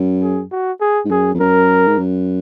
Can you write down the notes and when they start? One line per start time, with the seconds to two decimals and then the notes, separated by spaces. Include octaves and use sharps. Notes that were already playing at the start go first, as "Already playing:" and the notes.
Already playing: F#2
0.23 G#4
0.52 F#4
0.81 G#4
1.05 G#2
1.11 F#2 G#4
1.35 F2
1.40 F#2 A#4
1.88 G#2
1.99 F#2